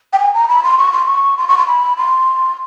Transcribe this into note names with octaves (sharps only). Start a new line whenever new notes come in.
G5
G#5
A#5
B5
C6
C#6
C6
C#6
C6
C#6
C6
B5
C6